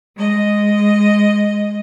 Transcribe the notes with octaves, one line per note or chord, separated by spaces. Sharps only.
G#3 D#5